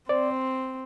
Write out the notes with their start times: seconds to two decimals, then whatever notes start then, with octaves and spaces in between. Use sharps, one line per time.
0.09 C4 C5 D5